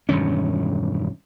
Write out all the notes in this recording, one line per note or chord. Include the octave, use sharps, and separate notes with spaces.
E1 G2 D#3 C#4